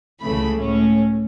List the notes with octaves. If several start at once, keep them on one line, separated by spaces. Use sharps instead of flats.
C#2 C#3 E3 A3 B5
A2 A3 C#4